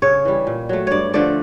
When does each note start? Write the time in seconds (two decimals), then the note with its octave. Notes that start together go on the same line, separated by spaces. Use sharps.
0.02 C#3 C#5
0.25 E3 G3
0.47 A#2
0.69 F#3 A3
0.87 G2 C#5 D5
1.14 D3 F3 A3 D5